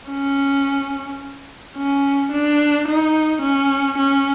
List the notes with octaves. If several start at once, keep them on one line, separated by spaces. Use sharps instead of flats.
C#4
C#4
D4
D#4
C#4
C#4